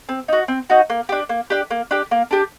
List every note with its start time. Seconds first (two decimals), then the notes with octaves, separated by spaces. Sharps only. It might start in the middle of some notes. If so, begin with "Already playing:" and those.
0.09 C4
0.28 D#4 F#4
0.48 C4
0.70 D#4 F#4
0.90 A#3
1.09 D4 G4
1.29 A#3
1.50 D4 G4
1.71 A#3
1.91 D4 G4
2.11 A#3
2.31 D4 G4